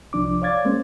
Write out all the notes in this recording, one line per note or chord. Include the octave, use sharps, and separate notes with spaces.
C2 F3 D4 D6
C#5 D5 F5 D6 G#6 A6
G#3 A#3 C4 C#4 C5